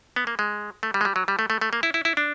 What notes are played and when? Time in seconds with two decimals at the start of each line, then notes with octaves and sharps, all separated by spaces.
0.16 B3
0.27 A#3
0.39 G#3
0.83 A3
0.94 G3
1.01 G#3
1.05 G3
1.16 F#3
1.28 G3
1.39 A3
1.50 A3
1.61 A3
1.73 A#3
1.83 E4
1.94 E4
2.05 E4
2.17 D4